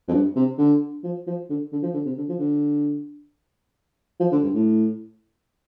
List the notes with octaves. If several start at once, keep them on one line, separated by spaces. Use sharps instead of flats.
F2
G2
C3
D3
F3
F3
D3
D3
F3
D3
C3
D3
F3
D3
F3
D3
G2
A2